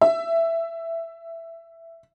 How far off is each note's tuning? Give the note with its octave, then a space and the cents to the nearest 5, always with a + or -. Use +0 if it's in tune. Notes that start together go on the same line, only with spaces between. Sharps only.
E5 +10